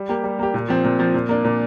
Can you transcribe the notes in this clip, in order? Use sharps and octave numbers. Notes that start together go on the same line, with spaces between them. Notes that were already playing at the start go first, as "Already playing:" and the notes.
Already playing: G3
A#3 G4
G3
A#3 G4
A#2
F3 C4
A#2
F3 C4
A#2
A#3 D4
A#2